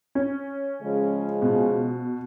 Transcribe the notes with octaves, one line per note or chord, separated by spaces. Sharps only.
C#4
C#3 F3 G#3
B2